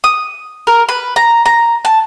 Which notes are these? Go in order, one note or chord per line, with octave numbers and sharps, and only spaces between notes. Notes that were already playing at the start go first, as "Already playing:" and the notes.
D#6
A#4
B4
A#5
A#5
A5